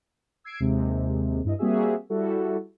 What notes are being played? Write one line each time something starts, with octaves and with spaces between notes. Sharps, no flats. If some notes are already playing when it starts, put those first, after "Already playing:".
E6 G#6 C7 D7
D#2 C3 G#3
G2 E4 D#5
G3 A#3 C4 F#4 G#4 E5
G3 E4 F#4 A4